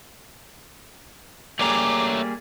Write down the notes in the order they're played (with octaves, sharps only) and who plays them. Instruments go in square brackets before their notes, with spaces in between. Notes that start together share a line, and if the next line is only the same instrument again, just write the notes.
[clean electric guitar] G3 A#3 G#4 [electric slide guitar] A3 C#5 A#5 [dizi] D6